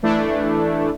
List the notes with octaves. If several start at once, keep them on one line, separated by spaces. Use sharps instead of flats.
E3 A3 D4 E4